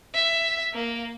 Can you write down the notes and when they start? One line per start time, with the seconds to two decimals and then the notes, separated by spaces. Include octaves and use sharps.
0.14 E5
0.74 A#3